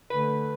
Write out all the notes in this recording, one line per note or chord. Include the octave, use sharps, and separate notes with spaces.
D3 A3 B4